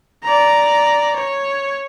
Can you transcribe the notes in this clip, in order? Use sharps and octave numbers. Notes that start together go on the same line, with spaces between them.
D5 A#5
C#5